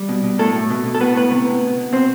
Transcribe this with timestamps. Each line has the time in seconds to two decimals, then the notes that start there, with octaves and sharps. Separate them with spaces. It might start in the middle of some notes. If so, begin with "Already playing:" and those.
Already playing: G3
0.09 B2
0.24 B2
0.39 A2 A3 A4
0.55 A2
0.70 B2
0.85 B2
0.95 A4
1.01 A2 B3 B4
1.16 A2 B3 B4
1.31 C3
1.46 C3
1.63 B2
1.78 B2
1.92 B2 C4 C5